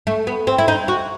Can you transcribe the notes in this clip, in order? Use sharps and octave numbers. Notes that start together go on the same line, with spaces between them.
A3
B3
C4
E4
D#4
F#4